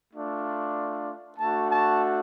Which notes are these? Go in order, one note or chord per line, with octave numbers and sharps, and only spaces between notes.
A3 D4 F4
A3 D4 F#4 A5
A5